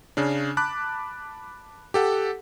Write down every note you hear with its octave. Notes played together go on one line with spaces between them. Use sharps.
C#3 C#4 D4
A5 B5 D6 F#6
G4 A4 F#5